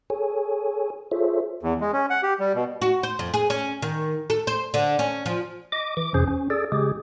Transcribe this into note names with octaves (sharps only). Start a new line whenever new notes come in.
G#4 A4 C#5 G#5
F4 G#4 A4 C5 C#5 E5
E2
G#3
C#4
F#5
G4
G3
B2
F#4
C5
F2
G#4
C#4
D#3
A4
C5
D3
C#4
F3
D#5 D6
E3 D6
F2 C3 C#4 G#4 C5
C#4
G#4 A4 D5
C#3 G#3 G4 G#4